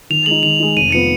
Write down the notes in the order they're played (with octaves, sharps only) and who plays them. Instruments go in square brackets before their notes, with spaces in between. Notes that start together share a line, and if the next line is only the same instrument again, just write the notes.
[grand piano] D#3 [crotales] F7
[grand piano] G#3 D#4 [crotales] F#7
[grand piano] D#3 [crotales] F7
[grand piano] G#3 D#4
[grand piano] F1 [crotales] D#7
[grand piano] F3 B3 [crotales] C#7